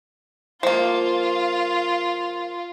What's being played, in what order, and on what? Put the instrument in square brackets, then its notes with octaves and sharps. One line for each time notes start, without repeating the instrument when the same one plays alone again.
[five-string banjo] F3 A#3 [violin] F4